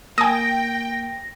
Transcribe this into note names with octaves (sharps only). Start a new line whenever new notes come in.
A#3 G5 G#5 D#6 A#6